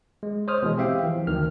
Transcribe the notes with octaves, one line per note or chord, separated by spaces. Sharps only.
G#3
C5 C#5 D#6 F6
B2 E3 G#3
C4 G4 E5 F5 G5
E3 F3
D2 D#3 F6